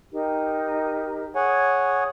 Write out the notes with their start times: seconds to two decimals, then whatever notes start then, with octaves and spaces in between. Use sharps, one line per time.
0.12 D#4 G4 A#4
1.35 G#4 C#5 F#5 G#5 D#6